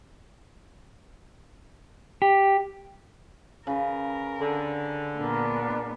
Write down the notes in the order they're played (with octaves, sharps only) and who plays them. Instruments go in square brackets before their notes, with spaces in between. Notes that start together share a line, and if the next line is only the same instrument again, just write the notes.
[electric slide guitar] G4
[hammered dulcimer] C#3 B4 [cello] A#4
[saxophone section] D3
[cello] A#2 B3 [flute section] D4 A#4